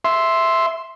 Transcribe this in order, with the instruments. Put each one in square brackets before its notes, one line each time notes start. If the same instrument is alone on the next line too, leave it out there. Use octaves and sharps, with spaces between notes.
[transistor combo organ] E5 C6